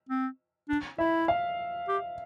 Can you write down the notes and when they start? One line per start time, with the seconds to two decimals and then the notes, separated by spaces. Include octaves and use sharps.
0.09 C4
0.69 D4
0.98 E4 E5
1.28 F5
1.88 G4